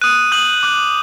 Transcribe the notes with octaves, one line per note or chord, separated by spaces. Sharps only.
D#6 F#6 D#7
D#6 G6 F#7
D6 F#6